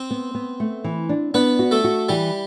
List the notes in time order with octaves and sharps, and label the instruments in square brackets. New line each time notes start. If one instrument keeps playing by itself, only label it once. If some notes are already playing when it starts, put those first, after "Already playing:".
Already playing: [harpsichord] C4 C5
[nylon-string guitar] B3
B3
A3
E3
D4
[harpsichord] B3 B4 [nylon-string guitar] D4
[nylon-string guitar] F#4
[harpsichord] A3 A4
[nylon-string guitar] F#4
[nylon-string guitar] E3 [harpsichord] G3 G4